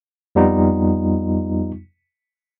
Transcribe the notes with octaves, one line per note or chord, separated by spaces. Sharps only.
F2 G3 B3 D#4 F4